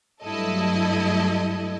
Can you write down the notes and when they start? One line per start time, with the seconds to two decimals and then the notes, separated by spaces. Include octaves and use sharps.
0.24 G2 F#3 A3 E4 A4 D#5